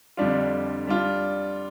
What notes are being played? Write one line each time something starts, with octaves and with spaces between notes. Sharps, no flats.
F2 D3 G3 D4 F4
G3 D4 F4